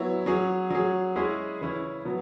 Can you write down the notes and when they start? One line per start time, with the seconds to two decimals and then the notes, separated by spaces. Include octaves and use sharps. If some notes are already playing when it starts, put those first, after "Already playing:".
Already playing: F#3 B3 E4 C#5
0.26 F#3 C#4 G#4
0.70 F#3 C#4 G#4
1.16 G#3 C#4 E4 G#4
1.61 C#3 E3 C#4 E4
2.05 B2 F#3 B3